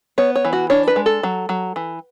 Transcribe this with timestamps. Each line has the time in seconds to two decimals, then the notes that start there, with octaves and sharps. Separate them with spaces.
0.18 B3 C#5
0.36 C#5
0.45 E3
0.53 F#4
0.70 D4 C#5
0.88 B4
0.96 G#3
1.06 A4
1.23 F#3
1.49 F#3
1.76 E3